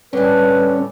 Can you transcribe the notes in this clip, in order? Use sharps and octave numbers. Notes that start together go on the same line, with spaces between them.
A2 D3 G3 C#4 B4 D5 G#5